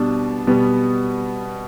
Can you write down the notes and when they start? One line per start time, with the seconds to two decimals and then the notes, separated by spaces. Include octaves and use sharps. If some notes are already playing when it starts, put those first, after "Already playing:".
Already playing: B2 G3 D4
0.47 B2 G3 B3